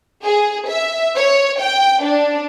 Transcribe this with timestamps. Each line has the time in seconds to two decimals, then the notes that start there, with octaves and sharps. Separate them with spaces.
0.23 G#4
0.68 E5
1.16 C#5
1.60 G5
2.04 D4